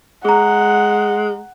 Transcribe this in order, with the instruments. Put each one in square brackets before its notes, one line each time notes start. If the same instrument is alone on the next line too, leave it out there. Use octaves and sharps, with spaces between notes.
[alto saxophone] G#3 [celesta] G#4 A#5 [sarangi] F#5